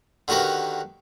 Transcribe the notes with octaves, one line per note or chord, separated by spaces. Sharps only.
D3 D#3 F#4 G4 A#4 B4